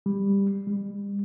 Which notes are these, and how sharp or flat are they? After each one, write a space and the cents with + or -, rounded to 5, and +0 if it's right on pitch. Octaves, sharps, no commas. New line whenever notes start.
G3 +15
G3 +40